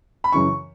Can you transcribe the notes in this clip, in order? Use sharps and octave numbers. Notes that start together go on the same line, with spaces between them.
B5
F#2 C#3 E3 C#6